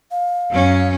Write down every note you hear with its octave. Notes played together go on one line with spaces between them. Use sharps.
F5
F#2 C#4